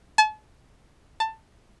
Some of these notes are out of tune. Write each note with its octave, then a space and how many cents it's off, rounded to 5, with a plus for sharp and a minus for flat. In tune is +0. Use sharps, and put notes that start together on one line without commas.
A5 -40
A5 +15